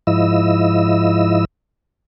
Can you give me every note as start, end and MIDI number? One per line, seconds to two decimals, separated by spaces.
0.07 1.45 44
0.07 1.45 53
0.07 1.45 64
0.07 1.45 75
0.07 1.45 88